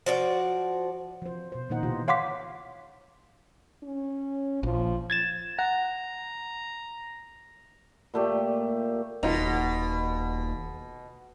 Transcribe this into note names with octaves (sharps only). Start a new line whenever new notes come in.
F3 F#4 D5
F3 C5
B2 C5
A#2 D#3 A#3 D#4 C5 F#5
B2 D3 E3 F4 G4
C#5 F5 F#5 C6 D6 B6
C#4
A#1 F3
G#6 A6 E7
F#5 A#5
A#2 A3 G4
D#1 B2 D#4 F4